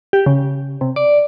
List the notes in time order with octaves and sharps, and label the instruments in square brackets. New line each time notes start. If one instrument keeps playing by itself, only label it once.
[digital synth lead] G4
C#3
C3
D5